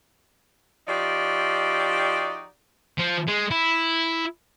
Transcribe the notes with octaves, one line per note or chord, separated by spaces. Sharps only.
F3 D#4 F#4 G4 D5
F3
G#3
E4